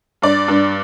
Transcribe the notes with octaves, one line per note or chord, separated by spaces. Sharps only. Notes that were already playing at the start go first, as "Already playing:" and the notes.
G2 D5
G2